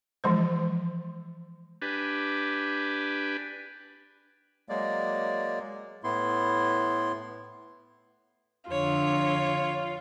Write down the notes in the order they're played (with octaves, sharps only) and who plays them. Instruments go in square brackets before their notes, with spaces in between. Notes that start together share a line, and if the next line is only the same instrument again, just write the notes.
[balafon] E3 F3 G#3 C5
[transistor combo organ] D4 G4 B4 G#5
[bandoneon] F#3 G#3 A#3 D5
A2 B3 E4 C6
[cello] F2 D3 [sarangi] F4 [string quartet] C#5